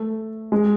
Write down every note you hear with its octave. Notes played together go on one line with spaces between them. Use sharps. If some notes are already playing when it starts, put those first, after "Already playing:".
Already playing: A3
G#3